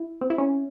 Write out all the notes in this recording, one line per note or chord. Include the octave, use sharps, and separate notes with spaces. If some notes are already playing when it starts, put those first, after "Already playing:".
Already playing: E4
C4
E4
C#4